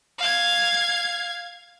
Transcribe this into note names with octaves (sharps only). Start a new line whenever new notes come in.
F5 G#6